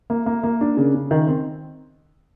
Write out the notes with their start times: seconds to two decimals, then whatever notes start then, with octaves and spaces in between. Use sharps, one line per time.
0.10 A#3
0.26 A#3
0.43 A#3
0.61 D4
0.77 C#3
0.94 C#3
1.11 D#3
1.27 C4